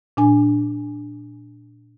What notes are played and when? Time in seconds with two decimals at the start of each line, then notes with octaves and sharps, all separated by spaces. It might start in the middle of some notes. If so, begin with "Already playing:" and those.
0.17 A#2 D4 G#5